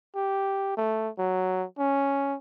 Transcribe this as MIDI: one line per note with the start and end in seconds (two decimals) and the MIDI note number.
0.15 0.73 67
0.77 1.10 57
1.18 1.65 54
1.78 2.36 61